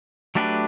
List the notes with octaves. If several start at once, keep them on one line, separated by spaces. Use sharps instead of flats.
F#3 A3 D4 G4 B4